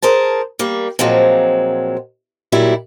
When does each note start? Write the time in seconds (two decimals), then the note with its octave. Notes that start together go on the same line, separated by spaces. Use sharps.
0.02 G#4 A#4 C5 A5
0.59 G3 A#3 G5
0.99 A#2 F3 F#3 G#3 C4
2.52 A#2 F#3 G3 E4